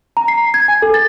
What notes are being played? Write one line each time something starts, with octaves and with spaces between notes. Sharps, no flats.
A#5
C7
G#6
G#5
A4
A6